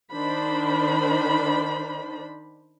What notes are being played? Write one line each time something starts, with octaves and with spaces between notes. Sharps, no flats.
D#3 D4 C5 B5